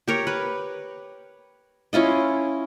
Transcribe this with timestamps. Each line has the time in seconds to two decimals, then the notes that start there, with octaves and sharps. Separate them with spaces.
0.08 G4 A#4 C#5
0.27 B4
1.93 C#4 E4 F4 D#5